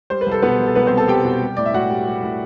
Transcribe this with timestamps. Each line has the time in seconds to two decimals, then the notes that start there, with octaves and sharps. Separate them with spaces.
0.10 G3 C5
0.21 B4
0.26 C2
0.31 A4
0.42 B2 B3 B4
0.59 C2
0.66 A4
0.75 C2 B3 B4
0.86 C4 C5
0.92 C2
0.97 A4 A5
1.08 C2 G4 G5
1.25 B2
1.42 G3
1.57 A2 D5
1.66 E5
1.74 A2 F#4 F#5
1.90 G3
2.07 G3
2.23 A2